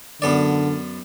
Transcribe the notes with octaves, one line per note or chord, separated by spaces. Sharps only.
F#2 D3 B3 D5